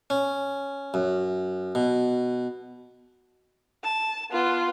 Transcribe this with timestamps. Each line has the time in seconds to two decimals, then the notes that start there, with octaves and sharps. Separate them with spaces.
0.10 C#4
0.94 F#2
1.75 B2
3.83 A5
4.31 B3 F4